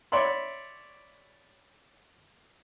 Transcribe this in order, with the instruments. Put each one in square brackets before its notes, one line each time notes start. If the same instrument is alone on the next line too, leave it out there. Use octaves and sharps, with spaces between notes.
[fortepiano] C#5 D5 E5 B5 C6